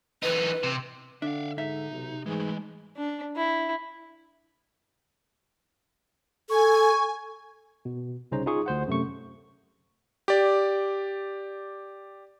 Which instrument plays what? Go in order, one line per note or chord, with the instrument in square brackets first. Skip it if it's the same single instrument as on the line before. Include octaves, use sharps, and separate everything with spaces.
[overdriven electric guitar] E3 D#4 [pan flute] B4
[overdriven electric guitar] C3
[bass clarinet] D3 [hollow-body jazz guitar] D4 [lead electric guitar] E5 F5
[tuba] G#2 [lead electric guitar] D#4 [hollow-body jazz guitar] E5
[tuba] B1 [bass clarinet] C3
[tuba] G#2 [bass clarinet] E3 [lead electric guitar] G#3 A3
[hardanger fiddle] D4
E4
[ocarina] A4 [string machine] G#5 [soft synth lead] C#6
[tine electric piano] B2
C2 C#3 C#4 D#4 C5 A#5
D#4 F4 G#4 C#6
D2 C5 F#5
F#2 C3 A3 C#6
[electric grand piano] G4 D5